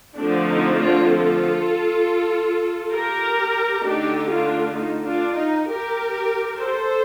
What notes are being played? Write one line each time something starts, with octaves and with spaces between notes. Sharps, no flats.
D3 F3 A3 C4 D4
D#4
D4 F4
F4 A4
G4 A#4
D3 A3 D4 D#4 G4
D4 F4
D#4
D4 F4
D#4
G4 A#4
A4 C5